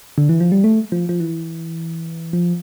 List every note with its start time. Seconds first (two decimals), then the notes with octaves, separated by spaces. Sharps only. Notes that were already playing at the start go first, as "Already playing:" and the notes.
0.18 D3
0.29 E3
0.41 F3
0.52 G3
0.64 A3
0.92 F3
1.09 F3
1.20 E3
2.33 F3